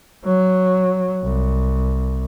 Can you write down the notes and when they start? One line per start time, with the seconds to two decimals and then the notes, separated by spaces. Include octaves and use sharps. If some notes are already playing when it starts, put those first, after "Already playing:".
0.25 F#3
1.23 C2